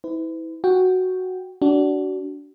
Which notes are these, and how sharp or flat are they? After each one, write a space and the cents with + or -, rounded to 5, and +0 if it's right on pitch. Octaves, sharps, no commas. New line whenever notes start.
E4 -30 B4 +40
F#4 +0 G5 +0
D4 -20 F#4 +25